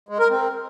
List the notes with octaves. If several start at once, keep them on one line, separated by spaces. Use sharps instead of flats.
G#3
A#4
C4